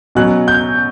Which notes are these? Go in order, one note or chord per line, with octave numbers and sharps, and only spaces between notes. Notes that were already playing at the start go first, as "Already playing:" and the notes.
B2 F#3 C#4 F#6
G6